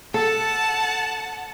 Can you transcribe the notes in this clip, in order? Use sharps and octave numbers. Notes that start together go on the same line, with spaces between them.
A4 F#5 A5